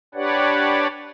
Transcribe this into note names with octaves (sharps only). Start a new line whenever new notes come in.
D4 G4 B4 C#5 D5 F#5